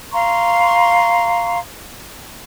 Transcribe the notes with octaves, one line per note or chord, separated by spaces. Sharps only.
F5 A#5 C6 C#6